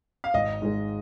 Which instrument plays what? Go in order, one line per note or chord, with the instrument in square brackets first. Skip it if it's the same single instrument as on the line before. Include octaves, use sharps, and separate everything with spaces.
[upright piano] F5
[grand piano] G#1 [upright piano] D#5
[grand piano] G#2 G#3